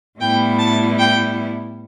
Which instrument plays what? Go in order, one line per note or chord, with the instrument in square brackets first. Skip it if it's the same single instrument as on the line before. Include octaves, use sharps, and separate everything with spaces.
[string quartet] A2 G3 B3 E4 G5
A5
G5